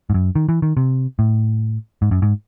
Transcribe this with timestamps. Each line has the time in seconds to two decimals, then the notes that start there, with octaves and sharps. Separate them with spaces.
0.10 G#2
0.14 F#2
0.36 D#3
0.49 E3
0.62 D#3
0.77 C3
1.19 A2
2.02 G#2
2.11 F#2
2.22 G#2